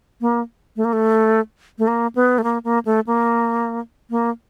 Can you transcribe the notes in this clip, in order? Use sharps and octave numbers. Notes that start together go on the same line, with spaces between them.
A#3
A3
A#3
A3
A3
A#3
B3
A3
A#3
A#3
A3
A#3
A#3